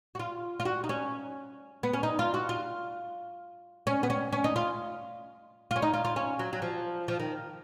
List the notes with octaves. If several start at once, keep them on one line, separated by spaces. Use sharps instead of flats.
F#4
F4
F4
F#4
D#4
C#4
B3
C#4
D#4
F4
F#4
F4
C#4
B3
C#4
C#4
D#4
F4
F4
C#4
D#4
F4
F4
C#4
F#3
F#3
F3
F3
D#3